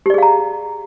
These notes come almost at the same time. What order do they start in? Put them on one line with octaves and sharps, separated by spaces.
G4 D5 G#4 F5 A#5